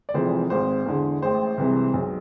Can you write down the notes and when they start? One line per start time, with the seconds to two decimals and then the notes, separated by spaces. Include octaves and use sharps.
0.09 D5
0.14 F1 F2 E3 G#3 C5
0.50 G#1 G#2 G#3 C5
0.86 E2 D3 G#3
1.22 A1 A2 G#3 C5
1.58 C2 C3 E3 G#3
1.93 B1 B2 G#3